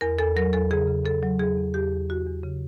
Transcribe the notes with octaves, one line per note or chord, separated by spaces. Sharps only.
E2 A#4
E2 A4
F#3 A#4
E2 A4
C#3 G#4
C#3
C#3 A4
F#3
E2 G#4
E2
E2 G4
E2
E2 F#4
E2
C#3